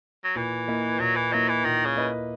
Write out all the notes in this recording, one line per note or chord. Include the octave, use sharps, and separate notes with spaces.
F#3
A#2 E3
A#3 E4 B4 D#5
A#2 F#3
E3
F#3 A#3 E4 B4 D#5
E3
A#2 D#3
C#3
A#3 E4 B4 D#5